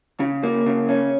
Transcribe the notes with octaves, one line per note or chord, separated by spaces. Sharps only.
C#3
A#3
C#3
C#4